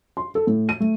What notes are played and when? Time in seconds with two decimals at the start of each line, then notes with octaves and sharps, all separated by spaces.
0.17 C6
0.35 A4
0.47 A2
0.69 D#7
0.80 A3